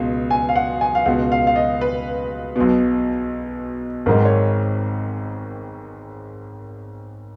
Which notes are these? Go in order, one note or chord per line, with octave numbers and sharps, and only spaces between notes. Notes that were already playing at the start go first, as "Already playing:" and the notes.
Already playing: C#2 B2
G#5
F5
F#5
G#5
F5
C#2 B2 F#5
F5
F5
D#5
B4
B1 B2
G#1 G#2 D#3 A#4
C#5